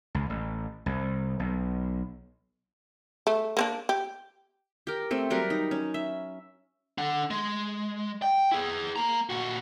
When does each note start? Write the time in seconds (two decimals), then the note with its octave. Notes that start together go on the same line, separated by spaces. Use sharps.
0.15 C#2
0.30 A1
0.86 C2
1.40 B1
3.27 A3
3.57 A#3 C4 D4
3.89 G4
4.87 G4 A#4
5.11 A3 C4
5.30 F#3 G3 A#4 B4
5.50 D#4
5.71 C#4
5.94 E5
6.98 D4 F#5
7.31 G#3
8.22 G5
8.52 E4 G#4
8.96 A#3 A#5
9.30 A#2 F#4